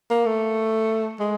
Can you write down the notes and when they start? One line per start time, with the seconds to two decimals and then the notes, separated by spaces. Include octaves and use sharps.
0.10 A#3
0.26 A3
1.20 G#3